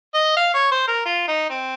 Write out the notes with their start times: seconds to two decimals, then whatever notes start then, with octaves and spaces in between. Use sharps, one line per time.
0.14 D#5
0.37 F5
0.54 C#5
0.71 C5
0.88 A#4
1.05 F4
1.28 D#4
1.50 C4